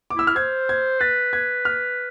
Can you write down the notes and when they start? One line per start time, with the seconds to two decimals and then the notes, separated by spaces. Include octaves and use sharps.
0.10 D6
0.15 E4 E6
0.27 F6
0.36 C5 G#6
0.69 G#6
1.00 B4 A6
1.33 G#6
1.65 F6